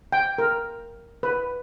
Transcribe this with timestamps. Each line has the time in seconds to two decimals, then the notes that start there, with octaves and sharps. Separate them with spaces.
0.12 G5
0.38 A#4
1.23 B4